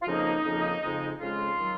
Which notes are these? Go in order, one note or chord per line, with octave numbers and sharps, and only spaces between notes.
F4
F2 C#3 F3 A#3 D#4
F2 C#3 F3 A#3
F2 C#3 G#3
F2 C#3 G#3 F4
D#3 F#3